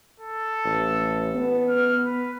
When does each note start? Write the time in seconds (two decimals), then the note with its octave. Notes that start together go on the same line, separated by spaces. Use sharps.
0.20 A4
0.65 A1
1.35 B3
1.69 F6
2.05 B4